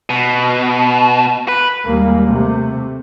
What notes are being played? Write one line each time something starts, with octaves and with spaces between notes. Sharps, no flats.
B2
B4
D#2 G3 G#3 A#3
C3 A3